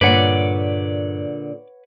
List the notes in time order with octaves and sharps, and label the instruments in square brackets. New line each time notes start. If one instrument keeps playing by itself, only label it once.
[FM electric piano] G2 [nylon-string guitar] A#2 D3 [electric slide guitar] B4 C#5 F#5 [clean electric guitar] D5